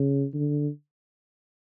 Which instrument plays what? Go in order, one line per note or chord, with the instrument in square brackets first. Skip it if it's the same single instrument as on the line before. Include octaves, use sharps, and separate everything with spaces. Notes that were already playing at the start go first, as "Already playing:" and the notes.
Already playing: [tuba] C#3
D3